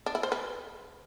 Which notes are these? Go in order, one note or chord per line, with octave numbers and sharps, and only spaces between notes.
D4
E4
C5
B4